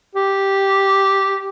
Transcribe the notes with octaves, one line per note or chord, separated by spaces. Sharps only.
G4